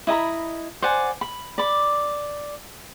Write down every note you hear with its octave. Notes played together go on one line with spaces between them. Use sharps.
E4 D#5 A#5 B5
C5 D5 F#5 G#5
B5
D5 B5